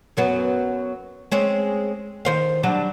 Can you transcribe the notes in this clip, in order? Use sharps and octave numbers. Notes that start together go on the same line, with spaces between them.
F#2 F#3 B3
G#3 C4 C#4
D#3 C5 F5
F#3 G3 D4